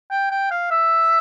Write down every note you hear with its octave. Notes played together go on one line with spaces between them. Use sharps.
G5
G5
F5
E5